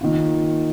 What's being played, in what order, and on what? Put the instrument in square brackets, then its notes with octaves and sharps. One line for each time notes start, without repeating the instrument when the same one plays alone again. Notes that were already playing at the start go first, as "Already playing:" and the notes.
[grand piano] D#3 A#3 F4